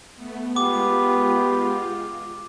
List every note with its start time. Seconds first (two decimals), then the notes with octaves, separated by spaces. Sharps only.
0.15 A3 B3
0.56 G#3 B3 F4 G4 D6